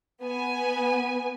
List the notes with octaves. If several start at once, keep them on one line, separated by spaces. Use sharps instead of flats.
B3 G#5